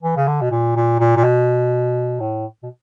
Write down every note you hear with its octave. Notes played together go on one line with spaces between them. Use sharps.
E3
C#3
D3
B2
A#2
A#2
A#2
A#2
B2
A2
B2